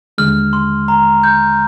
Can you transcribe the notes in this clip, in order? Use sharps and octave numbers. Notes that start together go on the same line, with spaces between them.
D#2 D3 G#3 F6
C6
A#5
G6